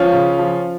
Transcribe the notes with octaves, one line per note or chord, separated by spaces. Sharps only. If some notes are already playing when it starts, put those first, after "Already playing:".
Already playing: F3 C#4 F4
C#3
F3